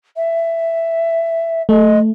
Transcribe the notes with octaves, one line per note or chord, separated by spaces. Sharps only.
E5
A3 D#5